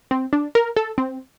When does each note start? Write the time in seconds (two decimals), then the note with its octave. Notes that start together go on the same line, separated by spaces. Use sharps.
0.11 C4
0.33 D4
0.55 A#4
0.77 A4
0.98 C4